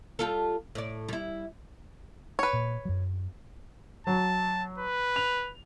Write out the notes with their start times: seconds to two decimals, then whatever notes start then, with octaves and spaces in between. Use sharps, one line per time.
0.19 G3 F4 A4
0.75 A2 D5
1.08 G3 E4
2.39 B4 C#5
2.53 A#2
2.85 F#2 F#3
4.07 F#3 A5
4.78 B4
5.16 F7